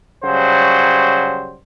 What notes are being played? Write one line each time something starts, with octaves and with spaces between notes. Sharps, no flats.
C#3 F#3 G3 C5